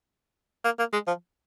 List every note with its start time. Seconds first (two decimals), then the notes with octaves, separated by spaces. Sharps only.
0.65 A#3
0.79 A#3
0.93 G#3
1.07 F3